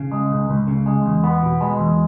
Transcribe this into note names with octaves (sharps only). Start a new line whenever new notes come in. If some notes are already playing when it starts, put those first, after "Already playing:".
Already playing: C#3
G#3
C#2
C#2
C#3
G#3
E2
B3
B2
G#3
E2